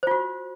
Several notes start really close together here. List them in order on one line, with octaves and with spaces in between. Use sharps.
C5 F4 F#4